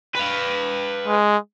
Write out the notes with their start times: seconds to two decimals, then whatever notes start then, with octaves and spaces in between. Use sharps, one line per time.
0.15 B4 F5
1.07 G#3